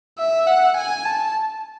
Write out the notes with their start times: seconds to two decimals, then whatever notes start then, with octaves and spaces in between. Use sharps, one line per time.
0.18 E5
0.47 F#5
0.77 G#5
1.05 A5